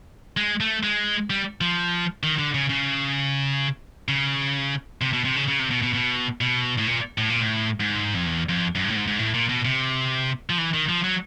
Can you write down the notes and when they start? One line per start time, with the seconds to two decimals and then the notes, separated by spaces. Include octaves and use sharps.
0.37 G#3
0.60 A3
0.83 G#3
1.30 G3
1.61 F3
2.23 D#3
2.38 D3
2.54 C#3
2.69 C#3
4.08 C#3
5.01 C3
5.13 B2
5.25 C3
5.36 C#3
5.48 C#3
5.59 C3
5.71 B2
5.83 B2
5.94 B2
6.41 B2
6.78 A2
6.87 A#2
7.18 A2
7.30 A#2
7.41 A2
7.80 G#2
8.14 F2
8.26 E2
8.49 F2
8.75 F#2
8.84 G2
8.90 A2
8.96 G#2
9.07 G#2
9.19 A2
9.34 A#2
9.49 B2
9.65 C3
10.50 F3
10.58 E3
10.73 D#3
10.89 F3
11.04 F#3